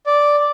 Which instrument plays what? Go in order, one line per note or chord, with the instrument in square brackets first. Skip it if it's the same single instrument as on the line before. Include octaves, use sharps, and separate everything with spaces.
[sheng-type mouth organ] D5